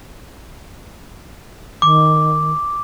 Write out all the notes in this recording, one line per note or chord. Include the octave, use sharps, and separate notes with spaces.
D#3 D6